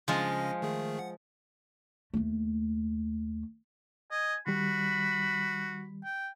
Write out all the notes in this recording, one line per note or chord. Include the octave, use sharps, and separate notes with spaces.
C#3 F3 G#3 C#4 F4 A#6
D#3 A3 G#4
F#5
D#2 A3
D#5 G#5
D#3 G3 F#4 B5
G5